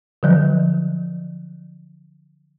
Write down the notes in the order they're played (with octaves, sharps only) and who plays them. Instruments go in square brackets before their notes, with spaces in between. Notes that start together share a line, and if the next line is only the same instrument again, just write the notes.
[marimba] D3 F3 F#3